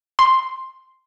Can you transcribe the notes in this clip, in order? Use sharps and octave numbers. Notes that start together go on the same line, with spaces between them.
C6